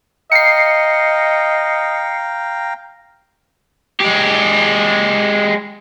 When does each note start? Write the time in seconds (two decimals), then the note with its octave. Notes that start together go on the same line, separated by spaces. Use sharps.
0.32 D#5 F5 G5 A#5 C7 C#7
4.00 G#3 G4